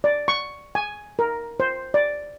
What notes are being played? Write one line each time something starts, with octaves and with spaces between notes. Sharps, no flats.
D5
C#6
G#5
A#4
C5
D5